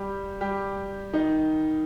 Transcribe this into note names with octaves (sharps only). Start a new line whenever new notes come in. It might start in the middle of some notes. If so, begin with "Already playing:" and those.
Already playing: G3 G4
G3 G4
D#3 D#4